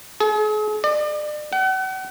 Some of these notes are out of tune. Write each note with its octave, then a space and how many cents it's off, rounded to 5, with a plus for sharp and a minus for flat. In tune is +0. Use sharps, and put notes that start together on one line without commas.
G#4 +40
D5 +40
F#5 +40